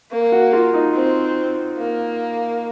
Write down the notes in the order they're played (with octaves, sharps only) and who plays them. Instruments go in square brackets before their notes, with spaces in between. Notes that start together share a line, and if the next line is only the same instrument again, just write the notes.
[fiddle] A#3
[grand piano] F#4
F4
D#4
[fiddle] C4
A#3